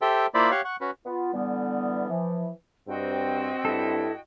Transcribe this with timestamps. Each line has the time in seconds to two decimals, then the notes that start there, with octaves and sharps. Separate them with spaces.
0.02 G4 A4 C5 E5 G5
0.34 A#3 E4 F4 C5 D5 B5
0.51 G4 C#5 F5 F#5
0.65 F#5 C#6
0.81 C#4 F#4 B4
1.06 B3 F4
1.34 D3 E3 G3 B3
2.09 E3 F3
2.88 G2 C4 F#4 D#5 G5
3.65 G2 E4 A4